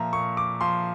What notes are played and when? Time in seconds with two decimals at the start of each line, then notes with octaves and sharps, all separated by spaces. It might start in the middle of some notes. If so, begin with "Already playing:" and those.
Already playing: A#2 F3 E5 A#5
0.13 A#2 C#6
0.37 D6
0.61 F3 C6